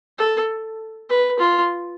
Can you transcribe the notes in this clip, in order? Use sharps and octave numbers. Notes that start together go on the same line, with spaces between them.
A4
B4
F4